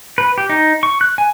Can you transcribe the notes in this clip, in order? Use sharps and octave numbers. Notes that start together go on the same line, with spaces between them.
B4
G4
D#4
C#6
F#6
G#5